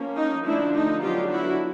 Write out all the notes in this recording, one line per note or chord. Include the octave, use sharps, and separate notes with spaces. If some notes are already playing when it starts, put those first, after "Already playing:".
Already playing: F3 A#3 C#4
D#4
D3 F3 A3 D4 E4
D#4
D3 F#3 B3 D4 F4 G4
E4 F#4